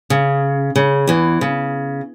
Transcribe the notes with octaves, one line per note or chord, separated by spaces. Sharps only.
C#3
C#3
E2 E3
C#3